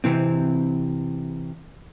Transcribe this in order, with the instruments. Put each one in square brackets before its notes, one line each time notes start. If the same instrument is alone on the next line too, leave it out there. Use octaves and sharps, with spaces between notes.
[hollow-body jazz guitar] C3 E3 C4